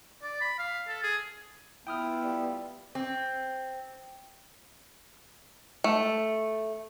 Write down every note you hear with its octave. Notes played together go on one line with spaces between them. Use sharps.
D5
B5
F5
A4
G#4
B3 E4 F4 G5 D#6 F6
G3
C4
A3